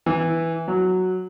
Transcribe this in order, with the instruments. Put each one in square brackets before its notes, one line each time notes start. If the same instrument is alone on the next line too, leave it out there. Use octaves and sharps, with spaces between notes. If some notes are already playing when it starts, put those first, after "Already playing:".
[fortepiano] E3
F#3